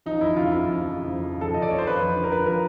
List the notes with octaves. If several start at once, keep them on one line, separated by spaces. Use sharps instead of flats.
F3 D#4
F2 E4
C#3 F4
F2 E4
F3
F2
C#3
F2
F3
F2 A4
C#3 D#5
D5
F2 C#5
C5
F3 B4
F2
D3
A#4
F2 B4
F3 A#4